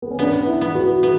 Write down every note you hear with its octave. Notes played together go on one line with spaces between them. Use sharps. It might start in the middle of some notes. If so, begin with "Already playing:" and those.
B3
C#4
B3 D4
E4
B3
F#4
B3 F#4